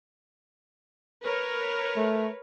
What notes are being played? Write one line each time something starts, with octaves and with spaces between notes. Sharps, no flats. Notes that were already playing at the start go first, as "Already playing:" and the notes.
A#4 B4 C#5
A3